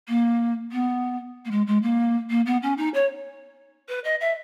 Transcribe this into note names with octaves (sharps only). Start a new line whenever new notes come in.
A#3
B3
A#3
G#3
G#3
A#3
A#3
B3
C#4
D#4
C#5
B4
D#5
E5